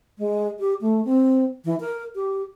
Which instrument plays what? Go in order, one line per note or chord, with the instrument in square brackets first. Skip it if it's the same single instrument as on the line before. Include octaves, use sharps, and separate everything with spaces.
[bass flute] G#3
G4
A3
C4
E3
A#4
G4